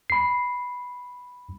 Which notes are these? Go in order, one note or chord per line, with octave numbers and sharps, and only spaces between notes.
B5 C7